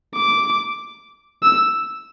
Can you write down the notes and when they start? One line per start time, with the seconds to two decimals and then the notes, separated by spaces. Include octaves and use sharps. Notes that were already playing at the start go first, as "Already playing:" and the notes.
0.15 D6
1.43 E6